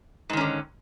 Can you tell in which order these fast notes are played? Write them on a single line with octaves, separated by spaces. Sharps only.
G#2 D#3 C#4 D3